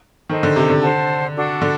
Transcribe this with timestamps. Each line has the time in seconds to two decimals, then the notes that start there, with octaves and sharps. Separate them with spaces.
0.30 D#3 A4 C5 D#5
0.43 D3
0.56 C3
0.70 D3
0.83 C5 F#5 A5
1.35 D4 F#4 A4
1.62 D3